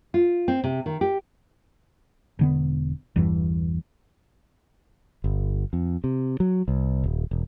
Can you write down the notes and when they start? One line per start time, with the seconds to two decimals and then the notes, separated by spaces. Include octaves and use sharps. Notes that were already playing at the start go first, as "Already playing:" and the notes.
0.14 F4
0.48 C4
0.64 C3
0.86 D#3
1.01 G4
2.39 E1 D3 B3
3.16 G1 E2 G2 E3
5.24 G1
5.73 F2
6.04 C3
6.40 F#3
6.68 C2
7.04 D#1
7.31 E1